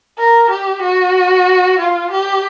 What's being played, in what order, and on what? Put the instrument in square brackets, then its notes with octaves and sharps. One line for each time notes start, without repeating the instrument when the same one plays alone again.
[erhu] A#4
G4
F#4
F4
G4